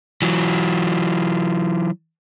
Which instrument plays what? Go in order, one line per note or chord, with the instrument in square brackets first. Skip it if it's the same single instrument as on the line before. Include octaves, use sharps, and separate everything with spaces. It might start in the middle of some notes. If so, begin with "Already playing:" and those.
[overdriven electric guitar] E3 F#3